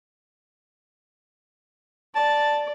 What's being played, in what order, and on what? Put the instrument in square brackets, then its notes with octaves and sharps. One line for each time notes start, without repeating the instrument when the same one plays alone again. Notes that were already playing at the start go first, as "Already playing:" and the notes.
[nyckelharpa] D5 [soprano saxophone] A5